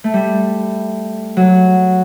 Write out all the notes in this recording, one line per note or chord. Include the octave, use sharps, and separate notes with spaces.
A3
G3
F#3